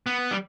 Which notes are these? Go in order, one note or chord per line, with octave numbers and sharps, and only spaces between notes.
B3
G3